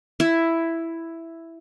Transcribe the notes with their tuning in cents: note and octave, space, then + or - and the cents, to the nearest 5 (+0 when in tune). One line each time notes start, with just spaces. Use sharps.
E4 +5